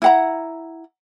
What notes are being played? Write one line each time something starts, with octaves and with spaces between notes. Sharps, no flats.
E4 F#5 A#5